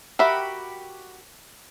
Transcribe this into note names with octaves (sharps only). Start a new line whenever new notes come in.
F#4 G4 A#4 E5 B5